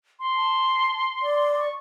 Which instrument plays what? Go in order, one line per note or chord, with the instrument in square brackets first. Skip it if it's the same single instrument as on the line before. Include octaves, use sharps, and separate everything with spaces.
[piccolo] C6
[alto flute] A5
D5
[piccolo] C#6